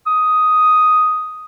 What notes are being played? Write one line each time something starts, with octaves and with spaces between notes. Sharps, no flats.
D#6